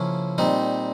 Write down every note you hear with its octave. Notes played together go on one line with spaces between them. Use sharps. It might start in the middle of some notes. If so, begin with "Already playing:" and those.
Already playing: C#3 F3 A#3 C#4 E4
A#2 G3 C4 D#4